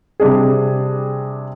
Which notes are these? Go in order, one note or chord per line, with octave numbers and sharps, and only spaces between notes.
C3 G3 D4 G#4